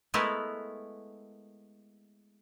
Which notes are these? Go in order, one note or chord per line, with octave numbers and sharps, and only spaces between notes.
G#3 A3 B3 E4 A#4 B4